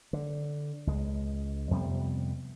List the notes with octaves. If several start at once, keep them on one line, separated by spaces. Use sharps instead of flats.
D3
C#2 G#3
F2 C3 G3 B3